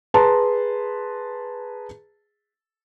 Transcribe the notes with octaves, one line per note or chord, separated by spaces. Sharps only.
G#4 B4 A5 A#5 C6